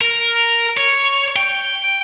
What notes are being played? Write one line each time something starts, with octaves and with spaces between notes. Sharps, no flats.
A#4
C#5
G5